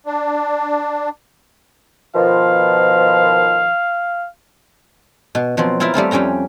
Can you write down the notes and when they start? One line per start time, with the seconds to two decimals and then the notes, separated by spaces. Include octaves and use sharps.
0.06 D4
2.15 B2 D#3 F3 F5
5.35 B2
5.57 B2 F3 F#3 C4
5.80 C4 E4 F4 A#4 E5
5.94 G3 A3 C4 F4
6.11 F2 G3 C#4 G5 A#5